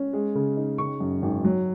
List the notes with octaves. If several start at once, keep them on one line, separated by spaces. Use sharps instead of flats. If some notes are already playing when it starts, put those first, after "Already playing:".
Already playing: C#4
G#3
C#3
D#4
C#3 C#6
F#2
G#1
F#3